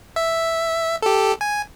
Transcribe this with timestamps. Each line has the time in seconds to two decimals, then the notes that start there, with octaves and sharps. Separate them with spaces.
0.16 E5
1.02 G4 A4
1.41 G#5